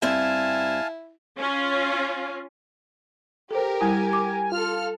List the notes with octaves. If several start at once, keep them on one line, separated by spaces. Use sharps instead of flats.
G2 C4 E4 E5 F5 G#5 A5
C#4 F4
G4 A4 A#4 C5
G3 E4 G#5
D6
F4 A4 F6